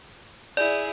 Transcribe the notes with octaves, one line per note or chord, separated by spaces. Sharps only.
E4 G#4 D5